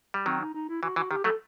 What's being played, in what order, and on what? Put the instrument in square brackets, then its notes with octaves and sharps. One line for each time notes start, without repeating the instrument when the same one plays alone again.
[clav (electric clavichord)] G3
[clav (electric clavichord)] D#3 F#3 [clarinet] C4
[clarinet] D#4
D#4
E4
[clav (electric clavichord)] E3 [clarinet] F#4
[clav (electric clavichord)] E3 [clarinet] F#4
[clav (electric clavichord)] D#3 [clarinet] G4
[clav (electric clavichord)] F#3 A3 [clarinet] A4